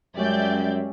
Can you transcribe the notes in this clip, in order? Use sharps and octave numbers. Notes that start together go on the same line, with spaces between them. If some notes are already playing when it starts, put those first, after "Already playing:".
F#2 G3 G#3 C#4 D5 E5 G6